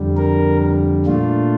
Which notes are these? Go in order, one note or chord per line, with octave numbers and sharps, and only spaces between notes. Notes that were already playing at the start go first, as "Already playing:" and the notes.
Already playing: F2 D3 G3
A#4
A#2 A3 D4 F4